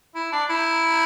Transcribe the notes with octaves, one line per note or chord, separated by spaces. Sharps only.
E4
D4
E4